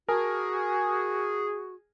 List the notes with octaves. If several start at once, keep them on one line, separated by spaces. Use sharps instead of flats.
F#4 G#4 A#4 A5